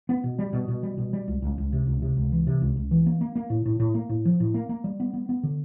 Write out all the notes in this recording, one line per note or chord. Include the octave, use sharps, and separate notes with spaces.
B3
B2
G3
B2
B2
G3
B2
G3
C#2
C#2
C#2
C3
C#2
C3
C#2
E3
C3
C#2
C#2
E3
A#3
A#3
A#3
A2
A2
A2
A#3
A2
F3
A2
A#3
A#3
G3
B3
B3
B3
D3